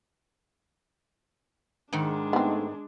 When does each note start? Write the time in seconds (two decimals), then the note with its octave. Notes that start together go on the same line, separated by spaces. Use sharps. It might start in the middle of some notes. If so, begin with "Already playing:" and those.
1.93 G#2 D#3 G#3 D4
2.33 A3 B3 C4 D#4